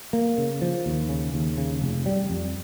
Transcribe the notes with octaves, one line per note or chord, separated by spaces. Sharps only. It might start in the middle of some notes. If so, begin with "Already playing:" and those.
A#3
C#3
F3
D#2
C#3
D#2
C#3
F1
G3
F2